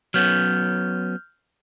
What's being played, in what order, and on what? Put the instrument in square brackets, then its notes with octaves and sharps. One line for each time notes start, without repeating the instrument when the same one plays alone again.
[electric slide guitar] F#3 B3 C#4 [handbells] F6 G6